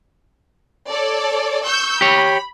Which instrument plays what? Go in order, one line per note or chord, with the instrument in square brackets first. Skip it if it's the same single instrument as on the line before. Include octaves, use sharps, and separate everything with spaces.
[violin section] A4 C#5 D5
C#6 E6 G6
[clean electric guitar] G4 C#5 [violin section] B5